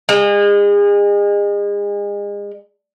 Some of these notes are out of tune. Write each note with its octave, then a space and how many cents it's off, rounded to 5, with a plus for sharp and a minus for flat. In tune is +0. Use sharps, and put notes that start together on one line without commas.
G#3 -35